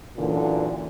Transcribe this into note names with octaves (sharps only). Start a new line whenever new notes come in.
F#2 A#2 D3 E3